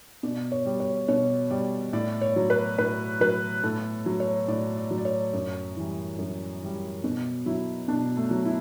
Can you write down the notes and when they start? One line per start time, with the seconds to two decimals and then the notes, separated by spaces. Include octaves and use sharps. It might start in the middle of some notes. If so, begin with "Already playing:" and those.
0.23 B2 D5
0.52 C#5
0.66 G3
0.80 C#5
1.08 B2 C#5
1.51 G3 D5
1.93 A2 D5
2.21 C#5
2.36 F#3
2.50 B4
2.78 A2 B4
3.21 F#3 B4
3.63 A2 A4
4.06 F#3
4.20 C#5
4.48 A2 D5
4.77 D5
4.91 F#3
4.98 D5
5.05 C#5
5.33 F#2
5.76 E3 G3
6.19 F#2
6.61 E3 G3
7.04 B2
7.46 F#3 E4
7.88 B2 D4
8.17 A3
8.31 F#3
8.45 E4